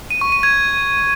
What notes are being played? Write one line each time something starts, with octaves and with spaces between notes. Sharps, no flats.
D#7
C#6
D#7
G#6